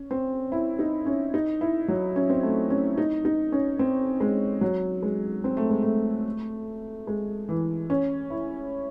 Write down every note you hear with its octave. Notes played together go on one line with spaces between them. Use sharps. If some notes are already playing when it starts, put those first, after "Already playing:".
Already playing: C#4
C4
E4
D#4
C#4
D#4
E4
F#3
C#4
C4
A3
C#4
D#4
D#4
C#4
C4
G#3
F#3
G#3
C4
A3
G#3
A3
G#3
E3
C#4
E4